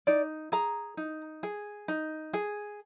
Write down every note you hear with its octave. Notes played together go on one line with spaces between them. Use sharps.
D#4 D5
G#4 A#5
D#4
G#4
D#4
G#4